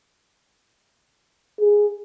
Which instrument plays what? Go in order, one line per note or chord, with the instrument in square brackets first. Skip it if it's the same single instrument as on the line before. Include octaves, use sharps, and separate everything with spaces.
[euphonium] G#4